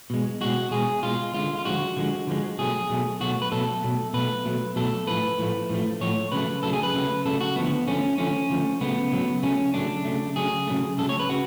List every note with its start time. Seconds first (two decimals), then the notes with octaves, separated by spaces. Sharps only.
0.10 B2 G#3
0.41 B2 G#3 F#4
0.71 B2 G#3 G#4
1.03 B2 G#3 F4
1.34 D3 F3 G#3 F4
1.58 F4
1.65 D3 F3 G#3 F#4
1.96 D3 F3 G#3
2.27 D3 F3 G#3
2.58 B2 F#3 A3 G#4
2.90 B2 F#3 A3
3.20 B2 F#3 A3 F#4
3.42 B4
3.52 B2 F#3 A3 A4
3.82 B2 F#3 A3
4.14 B2 F#3 A3 B4
4.45 B2 F#3 A3
4.76 B2 F#3 A3 A4
5.07 A2 F3 A3 B4
5.39 A2 F3 A3
5.69 A2 F3 A3
6.01 A2 F3 A3 C#5
6.32 C#3 F#3 A3 B4
6.63 C#3 F#3 A3 A4
6.73 G#4
6.83 B4
6.94 C#3 F#3 A3
7.25 C#3 F#3 A3 A4
7.41 F#4
7.56 D3 F3 A3 B3
7.87 D3 F3 A3 C#4
8.18 D3 F3 A3 C#4
8.49 D3 F3 A3
8.81 C#3 F#3 A3 B3
9.12 C#3 F#3 A3
9.43 C#3 F#3 A3 C#4
9.74 C#3 F#3 A3 D4
10.05 C#3 F#3 A3
10.36 C#3 F#3 A3 G#4
10.67 C#3 F#3 A3
10.98 C#3 F#3 A3 A4
11.09 C#5
11.19 B4
11.29 C#3 F#4